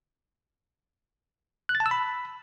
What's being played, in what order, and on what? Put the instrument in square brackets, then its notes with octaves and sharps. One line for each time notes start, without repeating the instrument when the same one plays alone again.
[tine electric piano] F#6
A6
A5
E6
B5